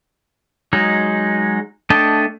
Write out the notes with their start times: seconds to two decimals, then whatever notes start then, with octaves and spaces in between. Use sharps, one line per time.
0.73 F#3 G#3 D#4
1.90 A3 D4 D#5 G5 A5